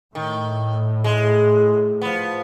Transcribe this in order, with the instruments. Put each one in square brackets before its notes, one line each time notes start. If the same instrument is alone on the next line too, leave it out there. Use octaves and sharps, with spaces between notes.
[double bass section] A2 [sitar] D#3
[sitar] G#3
F3 B3